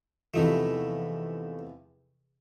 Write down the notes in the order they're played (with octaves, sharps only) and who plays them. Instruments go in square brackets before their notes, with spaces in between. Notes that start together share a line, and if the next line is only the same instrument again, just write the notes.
[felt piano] E2 C3 F3 [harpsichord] A3 D#4 E4